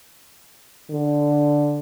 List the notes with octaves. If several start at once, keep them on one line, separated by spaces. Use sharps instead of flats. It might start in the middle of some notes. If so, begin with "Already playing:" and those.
D3